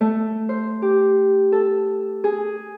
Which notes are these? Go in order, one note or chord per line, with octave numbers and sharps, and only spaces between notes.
A3
C5
G4
A4
G#4